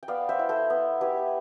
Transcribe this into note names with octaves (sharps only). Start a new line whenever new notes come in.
G5
B3 D5 F5
C5 E5
E4
A4 C5
B3
E4 G4 B4